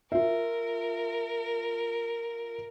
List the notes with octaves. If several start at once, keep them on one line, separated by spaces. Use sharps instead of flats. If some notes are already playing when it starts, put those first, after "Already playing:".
F4 A#4 E5